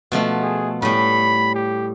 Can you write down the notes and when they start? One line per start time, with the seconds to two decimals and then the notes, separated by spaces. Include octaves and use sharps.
0.12 B2 F3 A3
0.42 G#4
0.82 A2 G3 B5
1.55 G4